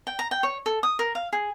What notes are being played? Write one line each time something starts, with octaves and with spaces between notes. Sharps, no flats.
G5
A#5
G5
C#5
A4
D#6
A#4
F5
G#4